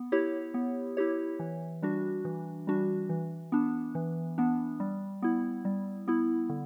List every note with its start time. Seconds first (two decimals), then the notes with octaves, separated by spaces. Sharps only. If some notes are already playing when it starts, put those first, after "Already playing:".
Already playing: B3
0.12 E4 G4 C#5
0.54 B3
0.97 E4 G4 C#5
1.39 E3
1.82 G3 D4 F#4
2.25 E3
2.67 G3 D4 F#4
3.09 E3
3.52 B3 D4
3.95 E3
4.38 B3 D4
4.80 G3
5.22 B3 E4
5.65 G3
6.08 B3 E4
6.49 D3